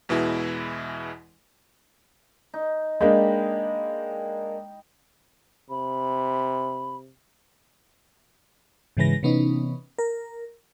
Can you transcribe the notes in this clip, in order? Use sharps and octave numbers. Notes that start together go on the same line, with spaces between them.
E2 B2 E3 G#3 E4
D#4
G#3 A#3 D4 D#5 G5 B5
C3 B5
G#2 C#3 E3 G#3 B4 A#6
C3 E3 B3 C#4 D#4
A#4